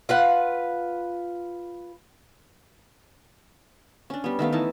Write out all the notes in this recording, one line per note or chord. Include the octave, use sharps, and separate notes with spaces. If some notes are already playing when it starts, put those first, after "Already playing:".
F4 B4 F#5
C#4 D4
G3 B3
D#3 A3 B3 F5
E3 D#4 A5